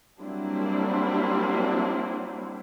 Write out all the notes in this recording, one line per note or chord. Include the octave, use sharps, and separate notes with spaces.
F#3 G3 A#3 C4 D4 E4